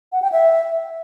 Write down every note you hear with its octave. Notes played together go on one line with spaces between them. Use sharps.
F#5
G5
E5